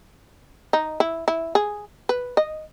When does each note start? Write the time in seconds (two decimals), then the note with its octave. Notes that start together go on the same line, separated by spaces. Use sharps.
0.73 D#4
1.00 E4
1.28 E4
1.55 G#4
2.09 B4
2.37 D#5